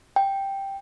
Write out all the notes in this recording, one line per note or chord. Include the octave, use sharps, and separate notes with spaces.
G5